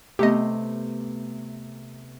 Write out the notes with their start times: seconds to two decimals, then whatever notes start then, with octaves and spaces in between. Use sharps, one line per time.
0.19 C3 A3 B3 G4 D#5